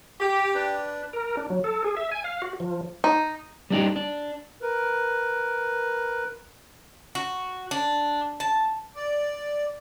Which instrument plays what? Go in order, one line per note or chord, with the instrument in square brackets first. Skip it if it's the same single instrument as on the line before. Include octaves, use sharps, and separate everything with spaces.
[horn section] G4
[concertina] D4 B4
[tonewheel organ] A#4
D4
F#3
A4
G#4
E5
G#5
F5
F#4
F3
[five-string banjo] D#4
[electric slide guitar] G3 D4 D#4 G4
D4
[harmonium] A#4 B4
[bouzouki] F#4
D4
A5
[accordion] D5